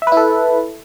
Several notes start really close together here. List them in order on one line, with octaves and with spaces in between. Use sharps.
E5 B4 E4 A4